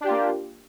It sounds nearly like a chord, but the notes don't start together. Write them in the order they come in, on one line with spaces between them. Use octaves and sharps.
D4 G4 F4 A#3